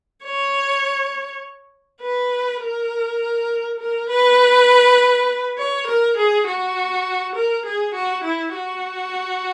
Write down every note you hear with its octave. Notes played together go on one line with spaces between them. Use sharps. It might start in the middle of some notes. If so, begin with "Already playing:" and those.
C#5
B4
A#4
A#4
B4
C#5
A#4
G#4
F#4
A#4
G#4
F#4
E4
F#4